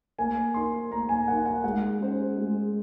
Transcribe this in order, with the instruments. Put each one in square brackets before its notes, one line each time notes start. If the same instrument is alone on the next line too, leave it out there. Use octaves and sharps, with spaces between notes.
[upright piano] A#3 [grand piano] G#5
[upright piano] D#4 A#4 [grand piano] C6
[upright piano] A#3 [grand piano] A#5
[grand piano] G#5
[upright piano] D#4 A#4 [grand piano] F#5
[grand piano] F#5
[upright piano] G#3 [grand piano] F#5
[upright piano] C#4 G#4 C5
G#3